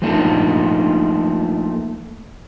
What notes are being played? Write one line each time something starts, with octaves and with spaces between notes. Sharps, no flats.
F3 A3 A#3 D4 D#4